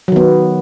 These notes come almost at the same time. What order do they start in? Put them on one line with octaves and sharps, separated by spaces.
F#3 D#3 B3